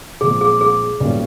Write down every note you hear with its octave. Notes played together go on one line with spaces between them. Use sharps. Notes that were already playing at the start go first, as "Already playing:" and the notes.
B1 A#2 F3 G#3 C4 G#4
G#4
G#4
B1 A#2 G3 A#3 C#4